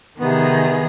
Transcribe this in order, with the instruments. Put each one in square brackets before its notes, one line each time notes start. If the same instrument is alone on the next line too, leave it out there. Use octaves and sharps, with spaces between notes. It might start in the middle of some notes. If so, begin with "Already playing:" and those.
[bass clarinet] C3 [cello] D#3 G#4 [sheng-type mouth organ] B3